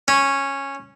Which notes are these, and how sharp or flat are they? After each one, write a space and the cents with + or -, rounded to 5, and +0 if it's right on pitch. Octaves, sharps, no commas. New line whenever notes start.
C#4 -10